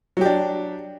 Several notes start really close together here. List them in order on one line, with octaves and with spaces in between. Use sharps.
F#3 G4 D4